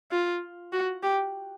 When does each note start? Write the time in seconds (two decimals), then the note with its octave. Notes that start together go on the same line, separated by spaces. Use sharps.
0.11 F4
0.73 F#4
1.03 G4